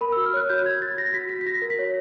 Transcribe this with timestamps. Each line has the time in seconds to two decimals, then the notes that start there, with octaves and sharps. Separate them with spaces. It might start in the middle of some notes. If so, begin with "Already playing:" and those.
0.01 A#4 B5
0.12 E6
0.16 F#4
0.26 F6
0.33 C#5 F#6
0.49 F#4 G6
0.65 F#4 G#6
0.82 F#4 A6
0.97 F#4 A#6
1.14 F#4 B6
1.29 F#4 B6
1.41 B6
1.46 F#4 A#6
1.62 A#4
1.70 B6
1.79 C#5